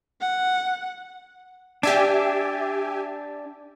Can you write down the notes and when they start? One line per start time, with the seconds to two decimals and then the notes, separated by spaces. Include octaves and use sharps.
0.21 F#5
1.83 D4 G4 E5 G#5